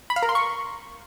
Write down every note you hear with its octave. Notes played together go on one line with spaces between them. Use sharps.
B5
F5
A#4
C6
C#6